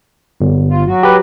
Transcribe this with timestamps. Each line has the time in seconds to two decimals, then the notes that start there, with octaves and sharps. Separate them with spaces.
0.41 G1
0.69 F4
0.86 F#3 F#4
1.03 G4 B4